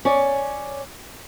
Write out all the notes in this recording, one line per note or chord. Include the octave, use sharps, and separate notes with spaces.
C#4 C#5 D5